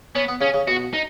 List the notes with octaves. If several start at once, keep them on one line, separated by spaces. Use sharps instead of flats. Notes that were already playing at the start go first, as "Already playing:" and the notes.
B3 C#4
B3
C#3 C#4
C#3
B2 F#4
D#4